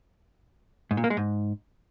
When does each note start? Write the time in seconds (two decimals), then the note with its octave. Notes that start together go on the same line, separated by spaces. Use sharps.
0.91 G#2
0.97 A#2
1.04 A#3
1.10 G#3
1.17 G#2